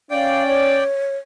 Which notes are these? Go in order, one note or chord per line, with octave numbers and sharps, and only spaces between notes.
C#4 D5 F5 G5
C#5